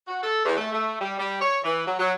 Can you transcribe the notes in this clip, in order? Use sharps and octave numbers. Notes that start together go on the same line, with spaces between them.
F#4
A4
E2
A3
A3
G3
G3
C#5
E3
F#3
F#3